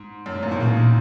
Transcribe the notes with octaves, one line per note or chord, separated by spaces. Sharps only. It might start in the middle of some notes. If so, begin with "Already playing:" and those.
Already playing: G#2
F#2
G#2
F#2 A#2
B2 D#3
A#2 C#3 E3